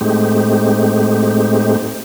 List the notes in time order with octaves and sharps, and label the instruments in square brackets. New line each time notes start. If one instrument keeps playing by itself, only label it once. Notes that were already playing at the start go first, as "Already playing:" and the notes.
[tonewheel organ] A2 G#3 A3 C4 D#4 G4